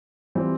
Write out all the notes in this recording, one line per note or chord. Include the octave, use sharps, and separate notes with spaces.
E3 G3 C4 F4